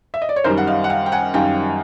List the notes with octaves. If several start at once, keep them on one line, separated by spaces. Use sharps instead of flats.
E5
D#5
D5
C#5
F#2 D#3 G3 A#4 C5
F#5
D#5 F5
F#5
F5 G5
G5
F#5 G#5
F#2 D#3 G3 F5 G5